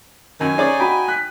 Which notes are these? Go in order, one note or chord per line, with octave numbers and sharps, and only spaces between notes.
F#2 D#3 G#5
C#4 D#4 G#4 D5
F#4 G5 A#5 B5
F#6 B6